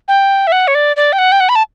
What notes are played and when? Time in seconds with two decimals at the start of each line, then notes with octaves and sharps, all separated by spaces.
0.08 G5
0.47 E5
0.52 F#5
0.67 C#5
0.75 D5
0.96 D5
1.13 G5
1.18 F#5
1.32 G5
1.40 F#5
1.49 B5
1.55 A5